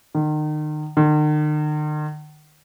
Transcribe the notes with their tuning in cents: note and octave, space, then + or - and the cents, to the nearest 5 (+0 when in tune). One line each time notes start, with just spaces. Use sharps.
D#3 -35
D#3 -45